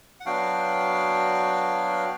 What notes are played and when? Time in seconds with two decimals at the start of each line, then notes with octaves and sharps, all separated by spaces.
0.20 F#5
0.26 F#3 B3 D4 F#4 F5 G5